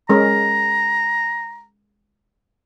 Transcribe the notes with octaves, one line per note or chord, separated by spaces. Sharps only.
G#3 C#4 A#4 A#5